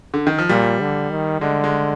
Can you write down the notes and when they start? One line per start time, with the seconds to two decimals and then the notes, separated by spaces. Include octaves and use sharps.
0.14 D3
0.27 D#3
0.38 F3
0.49 A#2 G3
0.80 D3
1.11 D#3
1.41 D3 G#3
1.64 G#3